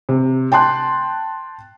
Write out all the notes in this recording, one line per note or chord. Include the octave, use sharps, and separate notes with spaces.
C3
G5 A5 C6 F#6